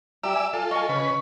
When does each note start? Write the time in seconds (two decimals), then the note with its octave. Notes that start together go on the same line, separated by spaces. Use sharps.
0.24 G4 D5 E5 A#5 E6
0.35 G#5
0.53 F4 A4 G#5
0.71 D#5 G#5 C#6
0.89 C#3 B4